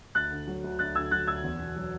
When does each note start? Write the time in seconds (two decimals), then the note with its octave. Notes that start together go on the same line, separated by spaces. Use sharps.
0.15 D2 F#6 A6
0.31 D3
0.47 F#3
0.64 D2
0.79 D2 F#6 A6
0.95 D3 E6 G#6
1.11 F#3 F#6 A6
1.27 D2 E6 G#6
1.44 E2
1.60 B2
1.76 F#3